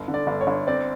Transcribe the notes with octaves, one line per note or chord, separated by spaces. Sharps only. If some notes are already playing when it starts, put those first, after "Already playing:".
Already playing: G1
D3
D5
G1
C#5
G1
C4 D5